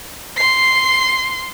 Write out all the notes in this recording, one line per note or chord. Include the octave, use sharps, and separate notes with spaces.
C6 C7